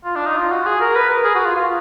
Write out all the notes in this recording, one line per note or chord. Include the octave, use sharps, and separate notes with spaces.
F4
D4
D#4
F4
F#4
G#4
A#4
B4
A#4
G#4
F#4
F4
F4